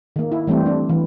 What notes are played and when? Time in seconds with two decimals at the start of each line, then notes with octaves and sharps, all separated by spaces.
0.16 D#3 A#3
0.32 E4
0.47 E3 G3 A3 C4
0.66 D4
0.89 E3